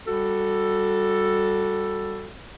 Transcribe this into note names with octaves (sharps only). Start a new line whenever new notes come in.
G3 F#4 A4